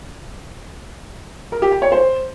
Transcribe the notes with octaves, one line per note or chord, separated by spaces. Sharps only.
A#4
G4
G5
C#5
C5